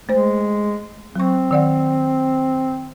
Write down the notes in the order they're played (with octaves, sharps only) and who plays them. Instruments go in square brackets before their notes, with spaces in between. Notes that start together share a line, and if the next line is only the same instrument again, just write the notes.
[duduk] G#3 [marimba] A3 C5
[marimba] F#3 C#6 [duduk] C4
[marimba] D#3 D5 F#5